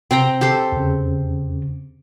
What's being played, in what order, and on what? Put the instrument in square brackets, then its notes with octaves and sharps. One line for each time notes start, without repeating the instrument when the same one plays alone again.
[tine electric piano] C3 [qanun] C4 G5 A#5
[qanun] G4 A4 C5
[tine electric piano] E2 C#3